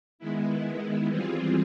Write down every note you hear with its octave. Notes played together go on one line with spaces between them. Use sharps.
D#3 G#3 B3 E4
E3 G3 C4 F4 G#4